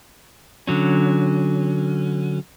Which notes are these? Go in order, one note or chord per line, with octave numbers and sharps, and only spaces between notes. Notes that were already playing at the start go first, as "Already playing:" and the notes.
D3 F#3 C#4